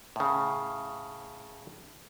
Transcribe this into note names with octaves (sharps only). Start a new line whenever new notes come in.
A2 C#3